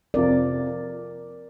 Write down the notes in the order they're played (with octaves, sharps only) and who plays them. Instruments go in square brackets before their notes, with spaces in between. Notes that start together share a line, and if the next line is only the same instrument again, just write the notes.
[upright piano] F2 C3 F3 [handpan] A#4 D5